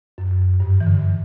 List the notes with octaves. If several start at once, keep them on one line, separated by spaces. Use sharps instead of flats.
F#2
G2
E3
D3